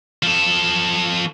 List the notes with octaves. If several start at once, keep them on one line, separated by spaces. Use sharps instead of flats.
F3 A4